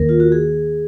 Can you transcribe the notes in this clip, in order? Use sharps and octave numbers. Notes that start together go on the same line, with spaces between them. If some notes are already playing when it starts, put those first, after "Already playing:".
Already playing: D#2 D#3 A#3 A#4
F4
F#4
G#4